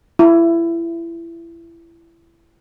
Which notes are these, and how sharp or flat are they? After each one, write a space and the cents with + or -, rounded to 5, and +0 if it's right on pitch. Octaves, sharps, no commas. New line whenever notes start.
E4 +25